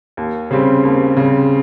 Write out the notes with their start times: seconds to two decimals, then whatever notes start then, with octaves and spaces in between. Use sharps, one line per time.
0.17 D#2
0.51 C#3 G3 C4
0.83 D#2
1.16 C#3 G3 C4